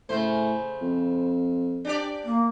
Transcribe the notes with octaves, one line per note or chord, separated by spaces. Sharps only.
A2 C#3 A3 C5
F2
D4 G4 D5
A#3